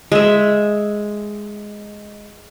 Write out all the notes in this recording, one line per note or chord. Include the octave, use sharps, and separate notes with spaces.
G#3 E5